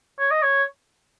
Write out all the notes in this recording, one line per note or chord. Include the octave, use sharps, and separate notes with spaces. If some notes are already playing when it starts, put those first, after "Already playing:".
C#5
D#5
C#5